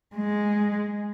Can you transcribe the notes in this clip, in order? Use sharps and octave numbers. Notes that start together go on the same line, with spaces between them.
G#3